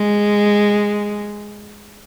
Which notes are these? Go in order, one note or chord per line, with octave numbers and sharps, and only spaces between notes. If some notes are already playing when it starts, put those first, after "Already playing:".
Already playing: G#3